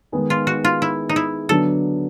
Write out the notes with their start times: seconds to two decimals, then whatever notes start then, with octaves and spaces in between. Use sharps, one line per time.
0.12 D#3 G#3 B3 D#4 G#4
0.30 F4
0.47 F#4
0.64 F4
0.82 E4
1.09 D#4
1.16 E4
1.49 D3 F#3 B3 D4 A4